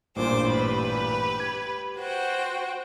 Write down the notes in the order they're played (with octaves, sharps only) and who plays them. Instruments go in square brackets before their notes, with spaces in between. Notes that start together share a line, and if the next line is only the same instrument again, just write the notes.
[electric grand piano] A1 G2 A#2 [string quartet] C5 D6
[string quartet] G4 B4 B5
[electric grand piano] G#6
[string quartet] F#4 C5 G5